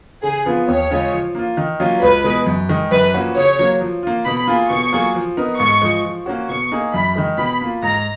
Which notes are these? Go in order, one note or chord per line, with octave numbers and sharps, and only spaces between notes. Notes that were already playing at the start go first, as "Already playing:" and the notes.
C#3 G#4
F3 B3 F4
D#2 C#5
C#3 G#3 C#4 F4
F3
A#3 F4
D#3
F#3 A#3 C#4 F4
C#2 B4
B2 G#3
F#2
D#3 G#3
F#2 B4
F3 A#3 C#4 F#4
C#3 C#5
F#3 A#3
F3
A#3 F4
B2 B5
A#3 F4 G#4
B2 C#6
F#3 A#3 F4 G#4
F3
B3 D#4 A#4
G#2 C#6
F3 G#3
F3
A#3 C#4 F#4
B2 C#6
A#3 D#4 G#4
F#2 B5
D#3 G#3
B2 B5
A#3 F4
G#2 A#5